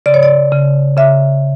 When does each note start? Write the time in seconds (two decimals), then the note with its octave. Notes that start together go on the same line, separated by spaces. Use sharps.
0.06 C#3 D5
0.14 C#5
0.23 D5
0.52 C#3
0.97 C#3 E5